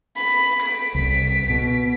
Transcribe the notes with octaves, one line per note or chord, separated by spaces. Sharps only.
B5
B6 D7
C2
B2